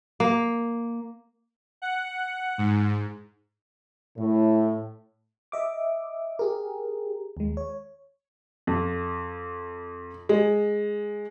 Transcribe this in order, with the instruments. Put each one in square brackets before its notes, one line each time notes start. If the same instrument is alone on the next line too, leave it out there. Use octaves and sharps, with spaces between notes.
[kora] A#3
[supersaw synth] F#5
G#2
[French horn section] A2
[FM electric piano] D#5 E5 D6
G4 G#4 A#4
D#2 G#3
C#5
[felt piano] F2
G#3